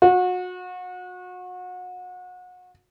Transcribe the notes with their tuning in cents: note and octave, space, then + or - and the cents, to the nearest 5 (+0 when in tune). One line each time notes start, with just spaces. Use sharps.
F#4 -30